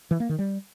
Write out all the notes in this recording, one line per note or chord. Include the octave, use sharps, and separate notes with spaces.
E3
A#3
D#3
G3